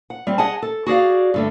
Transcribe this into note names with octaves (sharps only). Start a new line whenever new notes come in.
F#5
G3 C4
G#4 D#5 F#5 G#5 A5
A4
F#4 G#4 D5 F5
G2 D3 A3